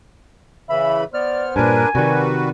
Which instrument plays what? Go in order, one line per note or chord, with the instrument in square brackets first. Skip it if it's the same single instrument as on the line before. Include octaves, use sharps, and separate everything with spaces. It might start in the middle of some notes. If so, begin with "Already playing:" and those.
[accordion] C#3 E3 B5 [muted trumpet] E5
[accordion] B3 F6 [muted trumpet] C5 [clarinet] D5
[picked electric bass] G2 A#2 [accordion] D4 A#4 B4 [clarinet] G#5
[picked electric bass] C3 D#3 [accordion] G3 F#4 B4 [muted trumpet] A#4